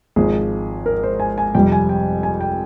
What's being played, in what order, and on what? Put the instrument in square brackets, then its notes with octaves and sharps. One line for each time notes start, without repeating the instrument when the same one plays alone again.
[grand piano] G#1 G#2 F3 G#4
A#4
C5
G#5
G#5
F2 C3 G3 G5
G#5
G5
G#5
G5